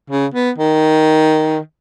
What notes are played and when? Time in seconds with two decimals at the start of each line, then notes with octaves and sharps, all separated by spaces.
0.10 C#3
0.34 B3
0.58 D#3